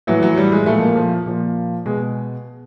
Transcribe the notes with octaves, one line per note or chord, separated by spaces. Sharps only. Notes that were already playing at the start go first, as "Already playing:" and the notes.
A2 E3 F#3
F#3
G3
G#3
A#2 F3 A3
A#3
F3
A#2 F3
B2 G#3